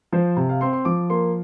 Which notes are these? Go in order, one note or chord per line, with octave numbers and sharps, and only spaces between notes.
F3 C5
C3
F5
C4 C6
C6
F3 D6
A#3 C6